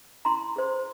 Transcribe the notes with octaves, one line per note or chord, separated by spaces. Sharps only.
E4 A#5 C6
G#4 C5